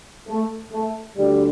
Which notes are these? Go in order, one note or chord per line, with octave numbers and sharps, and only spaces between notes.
A3
A3
D2 D3 G3